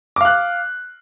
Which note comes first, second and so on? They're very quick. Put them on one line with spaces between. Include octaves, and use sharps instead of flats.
D6 F5 F#6